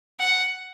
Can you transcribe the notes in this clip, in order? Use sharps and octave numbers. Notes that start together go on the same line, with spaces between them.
F#5